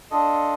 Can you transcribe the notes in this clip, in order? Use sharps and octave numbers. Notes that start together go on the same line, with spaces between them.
D4 F4 A4 D#5